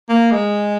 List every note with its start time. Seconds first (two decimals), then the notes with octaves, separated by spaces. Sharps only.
0.09 A#3
0.31 G#3